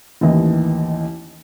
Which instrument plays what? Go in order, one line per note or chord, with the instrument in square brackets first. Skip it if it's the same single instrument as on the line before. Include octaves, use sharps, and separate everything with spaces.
[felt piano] A1 D#2 E3 D#5